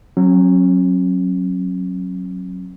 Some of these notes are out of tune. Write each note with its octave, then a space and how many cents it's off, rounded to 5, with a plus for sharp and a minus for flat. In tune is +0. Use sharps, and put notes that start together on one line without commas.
F#3 +0 C#4 -40